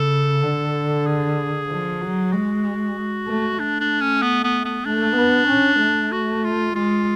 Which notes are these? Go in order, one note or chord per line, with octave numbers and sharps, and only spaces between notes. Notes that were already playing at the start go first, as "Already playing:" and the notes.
Already playing: C#3 A4
D3
G#4
F3
F#3
G#3 F#4
A3
A3 D4
D4
C#4
B3
B3
B3
A3 D4
B3
C#4
A3
F#4
F4
G#3 F4